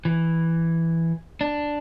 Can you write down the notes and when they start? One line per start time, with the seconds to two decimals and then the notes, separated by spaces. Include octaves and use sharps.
0.05 E3
1.41 D4